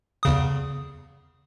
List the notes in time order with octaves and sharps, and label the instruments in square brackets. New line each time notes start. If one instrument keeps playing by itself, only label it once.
[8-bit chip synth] E2 C#3 D#6